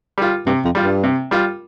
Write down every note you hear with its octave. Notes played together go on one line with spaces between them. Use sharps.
G3 F4
G2 C3
F2
G3 F4
G2
C3
G3 F4